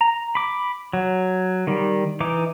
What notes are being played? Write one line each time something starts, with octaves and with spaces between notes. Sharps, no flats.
A#5
B5 D6
F#3
D#3 G3
E3 D#4 D6